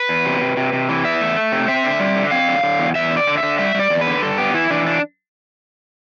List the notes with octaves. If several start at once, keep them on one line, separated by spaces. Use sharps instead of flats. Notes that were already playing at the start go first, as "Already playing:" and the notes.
Already playing: B4
E2
C3
C3
C3
C3
E3
E2 E5
A3
A3
C3
C4 E5
D3
G3
D3
C4 F5
D3
D3
E2
E2 E5
D3
D5
D3
E5
D3
G3 E5
G3 D5
E2
B4
D3
G2 A4
B3 G4
E3 E4
E3 D4
D4